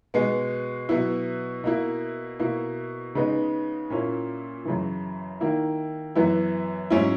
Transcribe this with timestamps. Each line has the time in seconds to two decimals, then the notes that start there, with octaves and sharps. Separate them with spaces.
0.14 B2 G#3 B3
0.89 B2 F#3 B3 E4
1.64 B2 A#3 E4
2.39 B2 A#3 E4
3.15 C#3 G#3 B3 D#4
3.90 A#2 A#3 C#4 E4
4.65 F#2 C#3 E3
5.41 D#3 A#3 E4
6.15 F#2 E3 B3 E4
6.90 G#2 F#3 C#4 E4